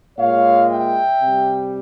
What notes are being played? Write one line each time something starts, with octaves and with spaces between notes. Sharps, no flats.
A#2 G#3 C#5 F5
E5 G5
C3 G3